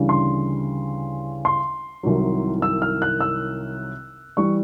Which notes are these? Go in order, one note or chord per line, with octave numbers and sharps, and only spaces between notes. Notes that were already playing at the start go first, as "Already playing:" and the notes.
Already playing: D2 C#3 E3 G3
C6
C6
C2 C3 D#3 F#3
E6
F6
F#6
E6
E3 G3 C#6